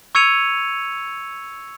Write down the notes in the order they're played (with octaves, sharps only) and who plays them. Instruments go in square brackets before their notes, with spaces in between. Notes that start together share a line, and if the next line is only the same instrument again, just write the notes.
[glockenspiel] C#6 E6 G#6 C#7 D#7 F7